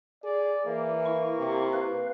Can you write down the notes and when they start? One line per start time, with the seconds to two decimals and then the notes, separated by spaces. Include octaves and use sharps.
0.24 G#4 D5
0.66 E3 A#3
1.06 E4 C#6
1.39 C3
1.73 B4 F5